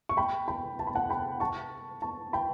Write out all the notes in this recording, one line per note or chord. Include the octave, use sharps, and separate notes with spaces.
C#6
G5 B5
G5 B5
A5
B5
F#5 A5
G5 B5
A5 C#6
A5 C#6
G5 B5